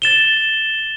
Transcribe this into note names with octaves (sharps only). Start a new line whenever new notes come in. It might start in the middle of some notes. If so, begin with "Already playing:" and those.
A6 E7 G7